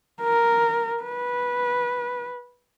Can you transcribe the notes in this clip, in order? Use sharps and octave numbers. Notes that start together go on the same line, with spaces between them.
A#4
B4